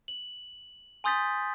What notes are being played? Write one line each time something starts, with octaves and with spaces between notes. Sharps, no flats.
F#7
G#5 C6 D#6 G6 A6 B6